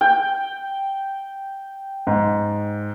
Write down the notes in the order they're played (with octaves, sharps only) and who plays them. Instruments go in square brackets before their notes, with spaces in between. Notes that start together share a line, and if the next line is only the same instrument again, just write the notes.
[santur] G5
[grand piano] G#2